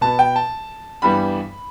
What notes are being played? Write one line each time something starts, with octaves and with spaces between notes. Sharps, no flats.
B2 B3 A5
G5
A5
G2 E3 G3 B3 B5